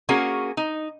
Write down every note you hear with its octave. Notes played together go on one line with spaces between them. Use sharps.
A#3 C#4 F#4 G#4 A#4
D#4